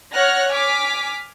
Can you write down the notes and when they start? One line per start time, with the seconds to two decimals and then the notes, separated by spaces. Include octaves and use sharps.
0.12 C#5 F#5 F6 F#6 A#6
0.52 G#5 D6 F6 B6